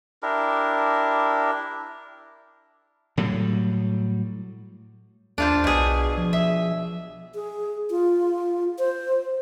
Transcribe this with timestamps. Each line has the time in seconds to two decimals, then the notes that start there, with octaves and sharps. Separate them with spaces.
0.23 D4 E4 G4 A#4
3.17 A2 F#3 G3
5.38 D#2 D4 F4 C5
5.64 B1 B2 G#4
6.18 F3
6.33 E5
7.35 G#4
7.90 F4
8.79 C5